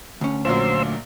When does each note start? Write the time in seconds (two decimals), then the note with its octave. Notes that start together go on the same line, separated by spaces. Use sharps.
0.21 D2 C#4
0.45 A#1 A#2 F#3 C5 C6 E6